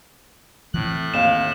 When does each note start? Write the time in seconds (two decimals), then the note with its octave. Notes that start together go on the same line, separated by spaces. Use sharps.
0.74 A2 E3 C4 F#6
1.14 D#2 C4 F5 E7